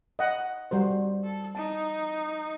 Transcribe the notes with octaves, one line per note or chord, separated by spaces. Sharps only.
D#5 F#5
G3 F#4 C5
A4
D#4 A5